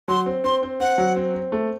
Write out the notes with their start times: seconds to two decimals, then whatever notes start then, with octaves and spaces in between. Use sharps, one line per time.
0.08 F#3 C6
0.26 C4
0.44 C4 C6
0.63 C4
0.80 C4 F#5
0.98 F#3
1.16 C4
1.34 C4
1.52 A3